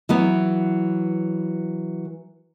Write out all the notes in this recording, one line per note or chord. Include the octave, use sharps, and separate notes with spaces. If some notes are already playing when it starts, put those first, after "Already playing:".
E3 F#3 B3